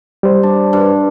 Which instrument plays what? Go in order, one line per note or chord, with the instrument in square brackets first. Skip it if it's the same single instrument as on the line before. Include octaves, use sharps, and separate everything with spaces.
[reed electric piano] G3 C5
[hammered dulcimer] D4
G2